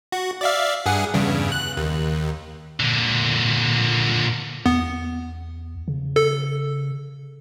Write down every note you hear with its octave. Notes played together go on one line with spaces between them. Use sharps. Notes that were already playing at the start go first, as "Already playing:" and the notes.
F#4
D5 E5 F5
G2 G#4 F#5
E2 G2 C#3
F#6
D#2
A#2 D3
E2 B3
C#3
A4